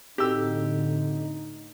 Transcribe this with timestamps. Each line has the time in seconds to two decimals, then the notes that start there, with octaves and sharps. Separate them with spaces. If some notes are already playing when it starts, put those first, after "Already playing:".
0.18 A2 D3 C4 D#4 F#4 G4 A4 E6